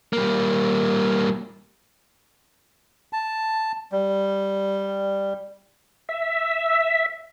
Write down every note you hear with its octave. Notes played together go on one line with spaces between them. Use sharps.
G3 A#3
A5
G3
E5